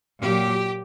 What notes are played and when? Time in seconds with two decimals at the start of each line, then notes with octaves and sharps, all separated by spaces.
0.21 A#2 F#3 G4